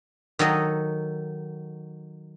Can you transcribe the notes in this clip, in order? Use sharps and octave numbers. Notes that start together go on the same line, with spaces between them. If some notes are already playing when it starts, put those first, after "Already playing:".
D#3 F#3 A4 D#5